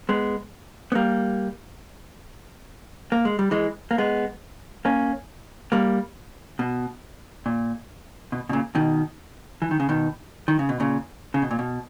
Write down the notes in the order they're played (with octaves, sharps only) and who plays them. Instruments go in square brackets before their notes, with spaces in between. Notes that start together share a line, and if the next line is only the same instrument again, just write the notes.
[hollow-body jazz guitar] G#3 B3
B3
G3 A#3
A#3
G#3
G3
E3 G#3
A#3
G#3 B3
A#3 C#4
G3 A#3
B2
A#2
B2
B2
A#2 C#3
B2 D#3
E3
D#3
C#3
B2 D#3
D#3
C#3
B2
A#2 C#3
C#3
B2
A#2
B2